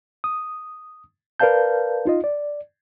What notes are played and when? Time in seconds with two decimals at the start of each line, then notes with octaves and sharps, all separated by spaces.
0.24 D#6
1.40 A#4 B4 D5 F5 A5 G6
2.05 D#4 F4 D#5
2.24 D5